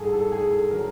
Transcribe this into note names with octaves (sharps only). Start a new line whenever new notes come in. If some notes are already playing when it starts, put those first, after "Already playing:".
Already playing: G#2 G3 G#4 A4
A4
G#4
A4
D3 F#3 A#4